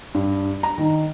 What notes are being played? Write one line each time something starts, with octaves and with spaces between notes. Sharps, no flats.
G2
A#5
D#3